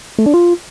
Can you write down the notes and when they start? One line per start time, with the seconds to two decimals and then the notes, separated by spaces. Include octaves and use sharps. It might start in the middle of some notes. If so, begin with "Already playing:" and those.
0.18 A3
0.26 D4
0.34 F4